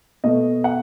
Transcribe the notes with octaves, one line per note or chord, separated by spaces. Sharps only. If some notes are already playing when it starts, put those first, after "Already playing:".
B2 A3 D#5
F#5